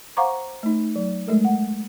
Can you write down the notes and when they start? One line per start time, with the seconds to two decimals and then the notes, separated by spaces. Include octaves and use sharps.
0.17 C5 F5 F#5 A#5 C#6 D6
0.63 A3 D#4
0.96 F#3
1.27 G#3 A3 A4 A#4
1.45 F#5